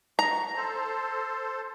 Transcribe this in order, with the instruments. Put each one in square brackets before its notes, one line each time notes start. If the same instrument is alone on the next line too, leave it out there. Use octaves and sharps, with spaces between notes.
[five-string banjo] A#5 [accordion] C#6
[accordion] A4 C5